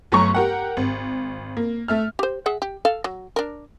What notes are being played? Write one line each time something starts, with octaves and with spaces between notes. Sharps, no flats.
G1 F#3 A3 A#5 C#6
G4 A#4 F#5
G#1
A#3
A3 E5 F6
G4 C5
G#4 E5 F#5
G4
A4 F5
F#3
D4 A#4